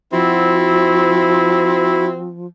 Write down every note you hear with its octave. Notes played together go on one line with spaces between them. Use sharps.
F3 C4 E4 F#4